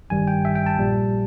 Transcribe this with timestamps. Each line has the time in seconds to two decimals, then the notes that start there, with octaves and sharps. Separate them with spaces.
0.10 G#1 G2 D#3 G3 G#5
0.27 G5
0.45 E5
0.55 G5
0.66 A5
0.78 A#1 A#2 G3